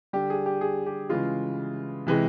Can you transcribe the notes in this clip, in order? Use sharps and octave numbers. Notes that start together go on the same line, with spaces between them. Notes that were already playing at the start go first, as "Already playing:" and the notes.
D3 G3 G4
G#4
G4
G#4
G4
C#3 E3 G#3 F4
C3 E3 G#3